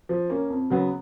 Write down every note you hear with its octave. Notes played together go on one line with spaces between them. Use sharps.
F3
A#3 C#4
F2
C#3 F#3 B3